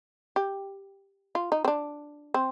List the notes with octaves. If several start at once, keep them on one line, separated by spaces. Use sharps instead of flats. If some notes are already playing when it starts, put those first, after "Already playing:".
G4
F4
D#4
C4
D4
C4